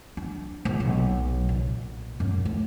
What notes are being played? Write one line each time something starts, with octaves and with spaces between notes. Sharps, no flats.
D4
A#1
B1
A#2
F#2
A3